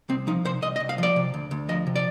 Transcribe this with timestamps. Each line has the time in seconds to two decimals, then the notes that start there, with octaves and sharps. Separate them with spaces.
0.09 C2 C4
0.27 F3 D#4
0.45 C3 C5
0.62 C2 D#5
0.76 D#5
0.80 C2
0.89 F5
0.98 F3 D5
1.16 C3
1.34 D2
1.51 D2
1.69 F3 D#5
1.87 C3
1.96 D5